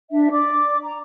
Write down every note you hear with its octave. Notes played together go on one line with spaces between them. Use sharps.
D4 E5
D5 D6
A#5